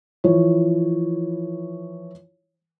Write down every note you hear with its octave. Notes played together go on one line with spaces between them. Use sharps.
E3 F3 E4 C#5